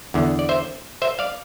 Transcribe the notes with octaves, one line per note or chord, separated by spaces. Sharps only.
E2 D3
D5
C5 E5
C5 E5
D5 F5